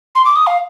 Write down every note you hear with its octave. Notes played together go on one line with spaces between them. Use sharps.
C6
D6
D#6
F5